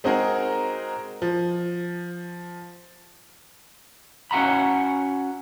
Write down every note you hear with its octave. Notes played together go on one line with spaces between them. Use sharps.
G#3 C4 D#4 F#4 G#4 A#4
F3
C#4 F#4 F#5 A#5 B5